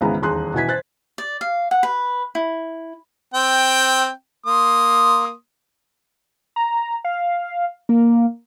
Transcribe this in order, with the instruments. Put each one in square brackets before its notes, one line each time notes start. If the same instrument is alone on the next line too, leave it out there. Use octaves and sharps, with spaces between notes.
[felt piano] G#1 C#2 E3 G#3 B3 A#5
D#1 E2 D#4 G#4 C6 F#6
B2 E3 G#5 G#6 B6
C5 F#6 A6
[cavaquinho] D5
F5
F#5
B4
E4
[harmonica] C4 G5
A#3 C6 D#6
[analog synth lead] A#5
F5
A#3